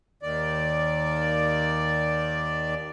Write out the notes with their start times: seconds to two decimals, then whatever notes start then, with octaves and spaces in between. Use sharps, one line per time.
0.23 D#2 D#3 D5